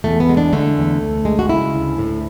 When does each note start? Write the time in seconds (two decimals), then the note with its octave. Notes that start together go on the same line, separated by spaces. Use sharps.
0.04 E2 A3
0.20 B3
0.29 G#3
0.37 D4
0.53 D3 A3
0.78 E2
1.02 D2
1.25 G#3
1.39 F#4
1.49 C#3 E4
1.74 D2
1.98 A2